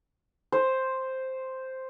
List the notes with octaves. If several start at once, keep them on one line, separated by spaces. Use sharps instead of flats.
C5